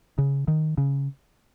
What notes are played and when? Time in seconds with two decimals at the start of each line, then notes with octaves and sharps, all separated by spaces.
0.18 C#3
0.48 D#3
0.78 C#3